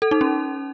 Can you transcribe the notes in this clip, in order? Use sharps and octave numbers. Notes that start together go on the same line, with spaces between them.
A4
D#4
C#4